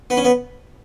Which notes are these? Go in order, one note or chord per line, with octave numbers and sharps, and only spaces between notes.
B3
C#4
B3